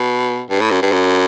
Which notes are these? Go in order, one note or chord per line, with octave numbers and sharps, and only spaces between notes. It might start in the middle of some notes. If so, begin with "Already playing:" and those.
Already playing: B2
G2
A2
F#2
G2
F#2